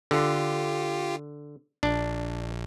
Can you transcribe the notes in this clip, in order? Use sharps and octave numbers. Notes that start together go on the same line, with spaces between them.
D3 F4 G4
A#1 D4